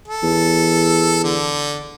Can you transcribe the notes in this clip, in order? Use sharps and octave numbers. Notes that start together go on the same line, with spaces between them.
A4
E2
D3